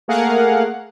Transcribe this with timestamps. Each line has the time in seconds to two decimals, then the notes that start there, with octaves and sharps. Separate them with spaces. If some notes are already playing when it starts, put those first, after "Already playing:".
0.08 A3 A#3 G#4 A#4 F5 F#5